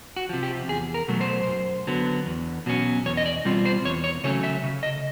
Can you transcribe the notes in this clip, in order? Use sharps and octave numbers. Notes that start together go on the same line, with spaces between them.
F#4
C3 F3
G4
E2 G#4
A#4
B2 F#3 A3
C5
F#2
D3 F#3 B3
E2
B2 F#3 A3 C#4
E2 C#5
D#5
D5
B2 G3 C4 F4
C5
E2 C#5
C#5
C#3 F#3 A3 C#4 C#5
E5
C#3
D#5